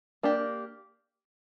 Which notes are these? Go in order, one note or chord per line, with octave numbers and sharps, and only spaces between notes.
A#3 D4 G4